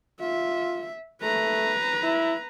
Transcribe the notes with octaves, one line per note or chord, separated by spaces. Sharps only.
F4 E5
A3 B4 A#5
E4